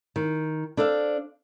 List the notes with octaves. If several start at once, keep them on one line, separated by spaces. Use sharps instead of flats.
D#3
D4 A4 C5 F5